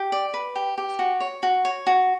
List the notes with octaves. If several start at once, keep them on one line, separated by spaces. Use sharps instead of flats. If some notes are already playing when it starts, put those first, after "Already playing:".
Already playing: G4
D5
B4
G4
G4
F#4
C#5
F#4
C#5
F#4